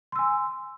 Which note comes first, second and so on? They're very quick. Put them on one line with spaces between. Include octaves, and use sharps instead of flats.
C6 E6 G#5